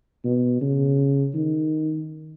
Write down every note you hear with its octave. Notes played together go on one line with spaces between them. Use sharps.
B2
C#3
D#3